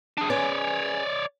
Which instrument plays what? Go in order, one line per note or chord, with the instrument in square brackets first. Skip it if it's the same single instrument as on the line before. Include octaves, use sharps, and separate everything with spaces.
[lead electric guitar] D4 G#4
[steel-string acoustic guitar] C#4 G#4 B4 [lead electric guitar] C#5 D5